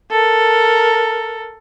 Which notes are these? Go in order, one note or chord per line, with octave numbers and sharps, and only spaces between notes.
A4 A#4